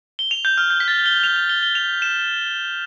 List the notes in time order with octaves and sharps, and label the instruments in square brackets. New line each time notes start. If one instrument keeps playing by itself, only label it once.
[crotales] G7
F7
G6
F6
G6
B6
A6
G7
F7
F7
G7
G7
F7
E7